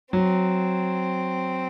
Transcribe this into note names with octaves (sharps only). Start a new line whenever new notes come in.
F#3 C4